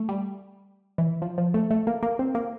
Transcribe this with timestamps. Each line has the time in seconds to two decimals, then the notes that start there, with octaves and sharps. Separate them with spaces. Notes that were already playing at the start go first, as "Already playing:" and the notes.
Already playing: A3
0.09 G3
0.98 E3
1.22 F3
1.38 F3
1.54 A3
1.71 A3
1.87 A#3
2.03 A#3
2.19 C4
2.35 A#3